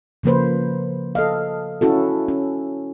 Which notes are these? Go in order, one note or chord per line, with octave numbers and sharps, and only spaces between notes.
C#3 F3 A#3 B4 C5
A4 D#5 F5
C#4 E4 F#4 A4
C#4